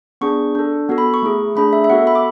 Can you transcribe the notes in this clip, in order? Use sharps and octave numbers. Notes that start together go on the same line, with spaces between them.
B3 D4 G#4 C#6
D4 A4
B3 F#4 A4
B5
C#6
A3 E4 G#4
A3 D4 G#4 B5
E5
E5
B3 F#4 A4 F#5
B5
D6